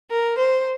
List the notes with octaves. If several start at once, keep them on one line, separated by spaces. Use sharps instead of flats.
A#4
C5